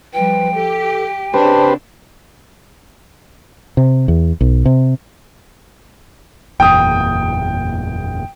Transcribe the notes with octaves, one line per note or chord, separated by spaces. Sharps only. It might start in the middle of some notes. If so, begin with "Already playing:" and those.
F3 G3 B4 G5
G4 A4
C#3 C4 D4 G4 B4 C5 A5
C3
E2
B1
C3
F#1 E2 A#2 G5 D#6